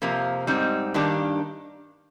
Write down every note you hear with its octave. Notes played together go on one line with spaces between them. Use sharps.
F2 C3 F3 A#3
G#2 G3 C4 D#4
G2 D#3 A#3 D4 G4